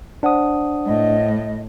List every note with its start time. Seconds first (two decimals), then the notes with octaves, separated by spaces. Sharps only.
0.23 D4 C5 F#5 D#6
0.86 A2 D#5